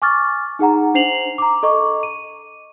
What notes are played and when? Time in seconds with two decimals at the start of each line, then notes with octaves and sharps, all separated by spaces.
0.02 G#5 C#6 D6 F6 A6
0.59 D#4 G#4 F#5 A#5
0.94 D4 C5 C7 F7 F#7
1.38 A#5 D6
1.63 A4 D#5 C#6 D6
2.03 D#7